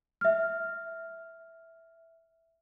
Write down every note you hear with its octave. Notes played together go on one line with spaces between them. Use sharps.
E5 F6